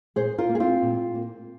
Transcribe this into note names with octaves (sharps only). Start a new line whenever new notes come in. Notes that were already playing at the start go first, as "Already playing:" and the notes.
A#2 G#4 C5
F4 A#4
A#3
G#4
C4 F4
A#2
A#3